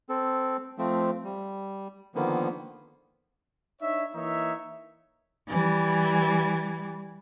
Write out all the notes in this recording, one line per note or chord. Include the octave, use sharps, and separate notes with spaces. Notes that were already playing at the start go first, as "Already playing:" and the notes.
C4 A4
F3 A3 C4
G3
D3 D#3 F3 A#3 B3
D4 D#4 C#5 E5
E3 A#3 D#4 C#5 E5
E3 G3